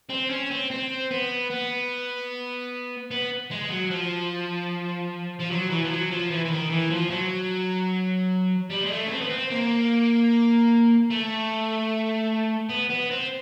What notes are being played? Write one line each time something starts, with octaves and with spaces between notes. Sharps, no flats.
C4
C#4
C4
C4
B3
B3
B3
G#3
F#3
F3
F3
F#3
E3
F3
F#3
F3
E3
E3
D#3
E3
F3
F#3
G3
G#3
A3
C#4
C4
B3
C4
A#3
A3
B3
B3
C4